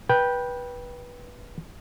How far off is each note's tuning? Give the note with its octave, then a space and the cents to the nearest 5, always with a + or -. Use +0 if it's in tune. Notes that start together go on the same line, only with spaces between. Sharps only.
B4 -20 G5 +0